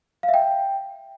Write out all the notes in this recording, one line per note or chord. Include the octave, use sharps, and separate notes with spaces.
F5
E5
G5